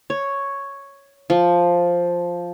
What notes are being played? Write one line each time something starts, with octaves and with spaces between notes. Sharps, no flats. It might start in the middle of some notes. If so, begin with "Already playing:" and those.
C#5
F3